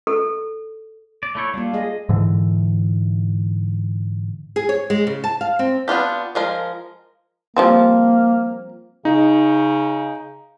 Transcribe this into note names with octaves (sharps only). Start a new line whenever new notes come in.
A4
D5
A3 E4 C#5
G3 A#3 D4 F4
G#3 G#4 D#5
G#2 D3 E3
G#4
C#5
G#3
C#3
A5
F5
C4
B3 D4 F4 G4
F3 G#3 A#4
F3 G3 A#3 C4
C#3 D#4